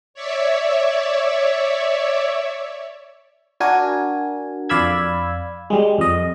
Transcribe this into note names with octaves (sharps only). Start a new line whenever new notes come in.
C#5 D5 E5
D4 F#4 A#4 G#5
F2 D5 F5 B5 E6 G#6
G3 G#3
F2 D#5